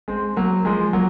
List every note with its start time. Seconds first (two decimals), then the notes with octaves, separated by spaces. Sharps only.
0.08 G#3 C4
0.36 F#3 A#3
0.65 F3 G#3
0.93 F#3 A#3